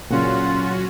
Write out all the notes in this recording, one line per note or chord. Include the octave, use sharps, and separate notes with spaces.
A#2 C#3 F#3 C#4 F4 F#4